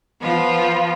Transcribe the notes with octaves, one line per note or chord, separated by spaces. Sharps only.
F3 B3 F4